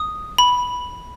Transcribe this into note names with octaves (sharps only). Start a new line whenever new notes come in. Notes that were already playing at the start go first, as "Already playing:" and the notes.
Already playing: D#6
B5